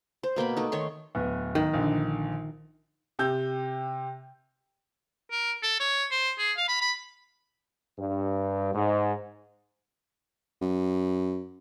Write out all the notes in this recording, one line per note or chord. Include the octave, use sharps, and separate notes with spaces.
C5
B2 A#3 G5 B5
A3 D#4
D#3 C#5 C6
D1 B3
D#3
A#1 D3
C3 G4 E6 G6
A#4
A4
C#5
C5
G#4
F5
B5
B5
G2
G#2
F#2